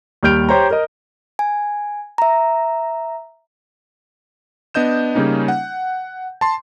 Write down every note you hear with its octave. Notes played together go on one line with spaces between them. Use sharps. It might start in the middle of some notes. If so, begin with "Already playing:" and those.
D#2 G3 F6 G6 D7 F7
G4 C5 C#5 A#5
A#4 D#5
G#5
E5 A#5
B3 D4 D#5 G6 E7
C#3 G3 A#3 C#4 D#4
F#5
A5 C6